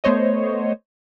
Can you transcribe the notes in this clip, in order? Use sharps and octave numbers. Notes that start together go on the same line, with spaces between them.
A3 B3 C5 C#5 D#5